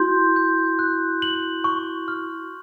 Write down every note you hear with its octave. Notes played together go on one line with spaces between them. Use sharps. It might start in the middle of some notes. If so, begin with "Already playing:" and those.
Already playing: E4 F#4 C6 G6
G6
F#6
F#7
C#6
F6